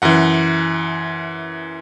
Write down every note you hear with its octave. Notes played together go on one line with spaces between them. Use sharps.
F#2 E3 F#5